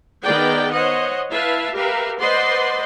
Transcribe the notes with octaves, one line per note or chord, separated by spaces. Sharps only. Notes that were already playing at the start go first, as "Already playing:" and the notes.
D#3 B3 G#4 B4 D5 G5
C5 C#5 D#5 F#5
E4 B4 E5 F5 A5
G4 A#4 B4 E5 F5
B4 C5 D5 D#5 F#5 C6